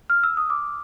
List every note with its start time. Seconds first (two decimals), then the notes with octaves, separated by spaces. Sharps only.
0.10 F6
0.24 E6
0.37 D#6
0.50 D6